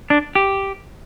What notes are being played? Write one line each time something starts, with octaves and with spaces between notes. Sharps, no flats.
D4
G4